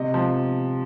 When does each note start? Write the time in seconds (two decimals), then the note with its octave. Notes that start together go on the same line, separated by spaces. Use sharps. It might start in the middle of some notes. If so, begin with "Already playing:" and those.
Already playing: C3 D#5
0.14 F3